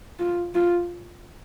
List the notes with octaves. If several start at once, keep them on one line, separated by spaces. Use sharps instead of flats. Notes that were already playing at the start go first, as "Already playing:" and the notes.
F4
F4